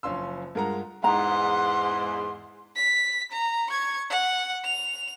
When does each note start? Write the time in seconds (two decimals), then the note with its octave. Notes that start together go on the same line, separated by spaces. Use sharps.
0.03 F#1 F3 C#4 F5 C6 E6
0.55 G2 G#3 F4 A#4 F#5 A#5
1.04 E2 G#2 F#5 A#5 C6
2.76 B6
3.31 A#5
3.70 C#6 G#6
4.10 F#5
4.64 F7